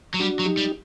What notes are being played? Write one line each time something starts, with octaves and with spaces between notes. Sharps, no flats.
F#3
G3 D4 F#4
F#3
D#4 G4
G3